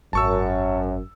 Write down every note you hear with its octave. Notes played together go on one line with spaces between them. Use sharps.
G#1 F#2 A5 C#6 E6